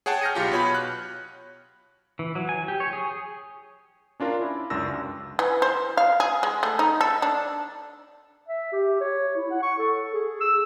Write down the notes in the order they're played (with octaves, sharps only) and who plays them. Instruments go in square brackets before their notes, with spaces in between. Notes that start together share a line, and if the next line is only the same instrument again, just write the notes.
[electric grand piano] G#4 C#5 F#5 G5 A5
F6 G6 A#6 C#7 D#7
B1 F4 G4
B2 C#5 B5
F#6
[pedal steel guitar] E3
F#3
G#5
G4
C#5
G#4
[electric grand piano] C#4 D4 F4 A#4
E4
C#2 F#2 D4 E6 A#6
[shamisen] E3
C5
F5
G#4
G#3
A3
D#4
A4
D4
[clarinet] E5
G4
C#5
E4
F#5
C#6
A4
G#4
E6